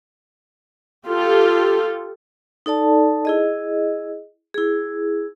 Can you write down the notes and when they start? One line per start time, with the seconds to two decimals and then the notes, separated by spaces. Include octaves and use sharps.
1.07 F4 G4 A4
2.66 D#4 A4 D5 A5
3.25 E4 G#4 D#5
4.54 E4 G#4